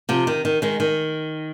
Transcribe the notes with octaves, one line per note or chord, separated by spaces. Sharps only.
C3 F3
D#3
D#3
D#3 G#3
D#3